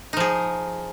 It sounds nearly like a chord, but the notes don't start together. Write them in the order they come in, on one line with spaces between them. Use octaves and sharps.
D#4 F3 G#4